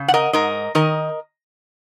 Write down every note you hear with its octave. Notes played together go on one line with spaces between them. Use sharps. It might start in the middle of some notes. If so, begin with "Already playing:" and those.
Already playing: C#3
F#5
A#4 D#5
G#2 A#4 D#5
D#3 A#4 D#5